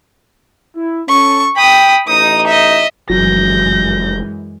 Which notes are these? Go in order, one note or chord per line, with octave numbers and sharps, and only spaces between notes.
E4
C#4 A4 C#6
G5 B5 D#6
A1 D#4 D#6
D#5 E5
F1 F#2 E3 F#3 G#3 G6 A#6